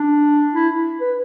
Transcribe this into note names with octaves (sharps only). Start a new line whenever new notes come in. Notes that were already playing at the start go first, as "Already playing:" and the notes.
Already playing: D4
E4
B4